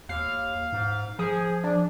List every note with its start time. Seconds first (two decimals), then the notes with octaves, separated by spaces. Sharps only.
0.09 D#2 F5
0.72 G#2
1.19 F3 G#4
1.64 D4